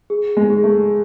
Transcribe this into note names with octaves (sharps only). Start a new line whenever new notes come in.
G#4
G#3
G#4
A3